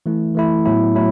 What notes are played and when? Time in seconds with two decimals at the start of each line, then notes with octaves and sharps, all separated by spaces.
0.06 E3 A3 E4
0.35 E3 A3 E4
0.65 A2 F#3 B3 E4
0.95 A2 F#3 E4